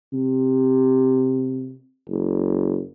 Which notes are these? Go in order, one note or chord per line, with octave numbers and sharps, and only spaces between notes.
C3
F#1